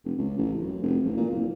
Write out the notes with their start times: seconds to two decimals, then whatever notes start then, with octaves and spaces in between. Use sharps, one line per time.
0.05 F1
0.18 C#2
0.38 A1
0.61 F#2
0.83 F1
1.05 A1
1.17 A#2
1.30 F#1